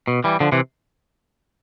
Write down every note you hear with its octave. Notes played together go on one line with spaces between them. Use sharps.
B2
E3 G3
D3 F3
C3 E3